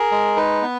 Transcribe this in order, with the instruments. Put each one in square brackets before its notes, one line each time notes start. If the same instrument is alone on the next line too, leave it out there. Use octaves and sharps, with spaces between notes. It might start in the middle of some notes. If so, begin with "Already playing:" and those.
Already playing: [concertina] G#4 A#4
G#3
D#4 B4
B3